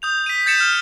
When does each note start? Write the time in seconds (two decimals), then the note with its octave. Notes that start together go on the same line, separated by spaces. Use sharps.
0.02 D#6 G6 F7
0.26 B6 D#7
0.46 G6 A6 C#7 E7
0.60 F6